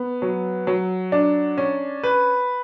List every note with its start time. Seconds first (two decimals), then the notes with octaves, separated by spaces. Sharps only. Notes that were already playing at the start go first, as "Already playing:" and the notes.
Already playing: B3
0.22 F#3
0.67 F#3
1.12 D4
1.58 C#4
2.03 B4